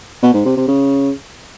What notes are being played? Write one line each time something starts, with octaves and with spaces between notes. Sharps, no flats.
B2
G#2
C3
C3
C#3